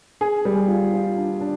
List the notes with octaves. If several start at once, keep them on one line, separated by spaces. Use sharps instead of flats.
G#4
G3
F4
F4
D4
D4